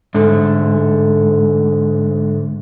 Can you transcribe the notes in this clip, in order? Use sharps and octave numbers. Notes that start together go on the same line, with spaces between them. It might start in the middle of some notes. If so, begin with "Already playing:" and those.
G#2 D3 A3